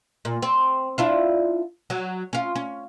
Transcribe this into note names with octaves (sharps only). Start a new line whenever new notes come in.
A#2
C4
D4 E4 F4
F#3
C#4 F4
C#4